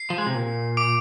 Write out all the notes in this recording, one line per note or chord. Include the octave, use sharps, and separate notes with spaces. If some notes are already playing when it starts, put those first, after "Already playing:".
Already playing: C7
F3
G#3
C3
A#2
D6 D7